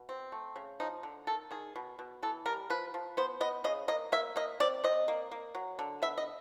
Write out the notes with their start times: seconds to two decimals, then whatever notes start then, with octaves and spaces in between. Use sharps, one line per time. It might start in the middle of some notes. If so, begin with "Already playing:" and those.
Already playing: B2
0.09 C4
0.32 A3
0.56 C#3
0.80 F3 D#4
1.03 D3
1.27 D#3 A4
1.51 D#3 G#4
1.76 B2
1.99 B2
2.23 E3 A4
2.46 G3 A#4
2.70 F3 B4
2.94 F3
3.17 B3 C5
3.41 B3 D#5
3.64 C#3 D#5
3.88 A#3 D#5
4.12 A#3 E5
4.36 A#3 D#5
4.60 C4 D5
4.84 C4 D#5
5.08 A#3
5.31 A#3
5.55 F#3
5.79 D3
6.02 B3 E5
6.18 D#5